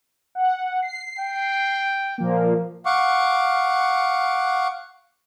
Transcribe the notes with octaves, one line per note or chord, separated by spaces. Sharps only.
F#5
C7
G5
A#2 F3 A#3
F5 F#5 C#6 D6